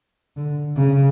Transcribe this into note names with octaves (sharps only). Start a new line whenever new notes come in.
D3
C#3